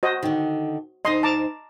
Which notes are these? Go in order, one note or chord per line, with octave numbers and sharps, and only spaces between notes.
F#4 C5 D#5
D3 D#3
D2 D#4 C5 D#5 C6
A5 A#5 D6